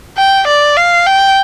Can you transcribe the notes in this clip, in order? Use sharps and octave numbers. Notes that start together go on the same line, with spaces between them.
G5
D5
F5
G5